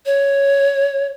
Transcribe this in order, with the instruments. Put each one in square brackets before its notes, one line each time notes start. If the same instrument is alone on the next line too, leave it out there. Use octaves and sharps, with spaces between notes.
[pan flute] C#5